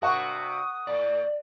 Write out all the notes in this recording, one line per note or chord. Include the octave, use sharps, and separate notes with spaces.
G2 C3 F#4 A#4 F#5 C#6 D#6
A2 D5